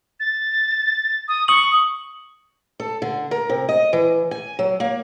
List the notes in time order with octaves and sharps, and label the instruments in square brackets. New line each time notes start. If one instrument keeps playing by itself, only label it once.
[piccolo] A6
D#6
[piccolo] C#6 [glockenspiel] D#6 F#7
[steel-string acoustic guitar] A4
D3
A#4
C3
D#5
E3
G#5
F#3
A#3